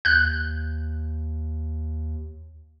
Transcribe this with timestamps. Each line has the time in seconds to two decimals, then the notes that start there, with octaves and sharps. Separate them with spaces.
0.05 D#2 F#6 G6